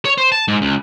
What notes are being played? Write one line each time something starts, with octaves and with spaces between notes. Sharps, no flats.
C#5
C5
A5
G#2
C#2